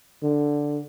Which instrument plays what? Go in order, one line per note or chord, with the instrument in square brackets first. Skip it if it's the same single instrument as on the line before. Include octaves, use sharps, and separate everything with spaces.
[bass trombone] D3